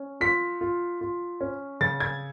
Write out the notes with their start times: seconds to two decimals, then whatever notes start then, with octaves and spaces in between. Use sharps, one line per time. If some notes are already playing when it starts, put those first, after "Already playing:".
Already playing: C#4
0.21 F4 B6
0.61 F4
1.01 F4
1.41 C#4
1.81 C#3 A6
2.00 G#6